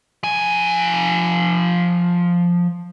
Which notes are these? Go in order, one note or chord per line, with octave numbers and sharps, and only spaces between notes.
F3 G#5